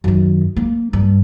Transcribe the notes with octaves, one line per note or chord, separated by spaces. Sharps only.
F#2 D#3
A#3
G2